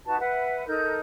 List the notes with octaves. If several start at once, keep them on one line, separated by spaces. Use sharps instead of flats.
D#4 F#4 B4 A5
B4 E5 F#5
D#4 A4 A#4 G6